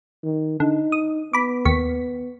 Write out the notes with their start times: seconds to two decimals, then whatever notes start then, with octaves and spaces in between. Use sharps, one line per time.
0.24 D#3
0.60 D3 D#4
0.92 D#6
1.33 B3 B5 D6
1.65 D#2 C#6 B6